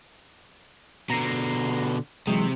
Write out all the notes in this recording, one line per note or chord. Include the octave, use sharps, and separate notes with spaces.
B2 D3 A#5 A#6 C7
C3 E3 F#3 G#3